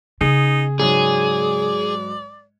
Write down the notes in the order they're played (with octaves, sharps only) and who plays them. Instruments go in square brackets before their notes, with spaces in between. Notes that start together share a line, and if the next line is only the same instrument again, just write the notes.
[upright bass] C#3 [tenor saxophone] D#4 [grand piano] G#4
[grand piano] G#2 F#3 G#3 [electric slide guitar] G#4 [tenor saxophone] D5